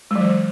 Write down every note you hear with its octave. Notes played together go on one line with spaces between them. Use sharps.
E3 F#3 G#3